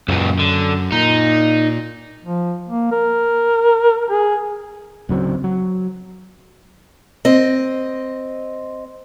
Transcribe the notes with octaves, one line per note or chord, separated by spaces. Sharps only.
C#2 F#2 A#2
D3
A#2 D#4
F3
A#3
A#4
G#4
D1 C#3 F#3 C4
F#3
C4 D#5